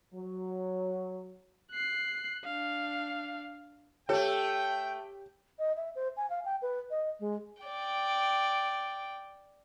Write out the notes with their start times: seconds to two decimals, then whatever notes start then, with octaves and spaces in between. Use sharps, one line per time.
0.14 F#3
1.71 F#6 C7
2.45 D4 F5
4.09 A3 G4 A4 C#5 G5
5.59 D#5
5.76 E5
5.95 C5
6.17 G#5
6.30 F5
6.45 G5
6.62 B4
6.91 D#5
7.20 G#3
7.62 D5 G5